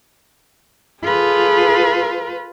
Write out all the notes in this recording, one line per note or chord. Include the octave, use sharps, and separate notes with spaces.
F4 G#4 A4 B4